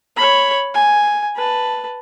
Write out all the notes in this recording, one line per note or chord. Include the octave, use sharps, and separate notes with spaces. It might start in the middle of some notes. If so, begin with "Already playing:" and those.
C#5 B5
G#5
B4 A5